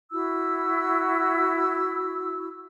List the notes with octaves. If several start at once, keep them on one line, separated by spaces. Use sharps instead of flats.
E4 F#4 E6